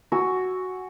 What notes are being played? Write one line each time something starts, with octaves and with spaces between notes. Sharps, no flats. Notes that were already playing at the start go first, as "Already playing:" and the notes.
F#4 G#5 E6